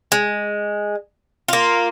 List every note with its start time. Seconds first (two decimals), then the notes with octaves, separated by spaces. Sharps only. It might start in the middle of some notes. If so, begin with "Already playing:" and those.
0.12 G#3
1.48 A#3 F4